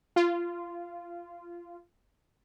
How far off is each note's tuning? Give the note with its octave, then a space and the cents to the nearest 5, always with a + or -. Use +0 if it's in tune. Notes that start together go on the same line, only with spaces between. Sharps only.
F4 -15